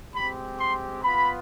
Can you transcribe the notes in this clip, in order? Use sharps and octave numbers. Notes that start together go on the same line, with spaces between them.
G#3 C4 G4 B5
C6
B3 F4 B5